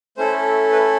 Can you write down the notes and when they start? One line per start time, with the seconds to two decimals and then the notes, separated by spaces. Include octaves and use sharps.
0.17 A3 C#4 E4 A4 C5
0.72 B4